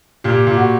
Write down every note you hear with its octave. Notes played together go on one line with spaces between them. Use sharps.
A#2 G4
A#2
F#4